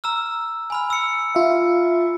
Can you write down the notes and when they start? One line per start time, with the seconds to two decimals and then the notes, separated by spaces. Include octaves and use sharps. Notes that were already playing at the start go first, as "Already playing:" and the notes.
0.04 A#5 E6 F6
0.70 G#5 B5 F6
0.90 E6 C#7
1.35 F4 E5 F5